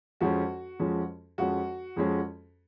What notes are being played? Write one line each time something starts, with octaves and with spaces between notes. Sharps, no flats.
F2 F3 G#3 C#4 F#4
F2 F3 G#3 C#4
F2 F3 G#3 C#4 F#4
F2 F3 G#3 C#4